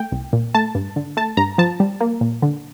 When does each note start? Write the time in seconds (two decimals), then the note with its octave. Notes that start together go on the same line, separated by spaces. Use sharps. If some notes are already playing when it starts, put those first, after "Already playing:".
Already playing: A3 G5
0.12 C2
0.33 A#2
0.55 A3 A5
0.75 G2
0.96 D3
1.17 A3 A5
1.37 G2 A#5
1.58 F3 A5
1.80 G3
2.01 A#3
2.21 A#2
2.42 D3